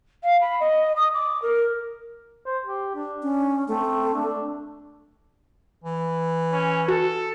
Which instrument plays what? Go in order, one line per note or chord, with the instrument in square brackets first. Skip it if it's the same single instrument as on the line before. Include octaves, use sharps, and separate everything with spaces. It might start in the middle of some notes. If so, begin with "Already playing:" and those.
[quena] F5
B5
D#5
D#6
D6
A#4
[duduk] C5
G4
D4
[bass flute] C#4
[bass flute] A3 [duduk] C4
[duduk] D4
[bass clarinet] E3
[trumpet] C#4
[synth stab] F#4 [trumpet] A4